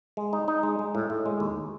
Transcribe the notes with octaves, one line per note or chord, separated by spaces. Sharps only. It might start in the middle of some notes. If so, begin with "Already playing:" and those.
G#3
D#4
D#4
G#3
G#3
A2
A2
G#3
D#2